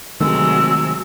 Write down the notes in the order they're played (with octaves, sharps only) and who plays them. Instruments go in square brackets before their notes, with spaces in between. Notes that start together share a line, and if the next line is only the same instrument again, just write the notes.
[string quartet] C3 F#3 G#3 [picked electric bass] D#3 A3 C4 [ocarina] E6